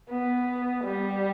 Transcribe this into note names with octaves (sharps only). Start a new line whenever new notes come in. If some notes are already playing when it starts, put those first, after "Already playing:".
B3
G3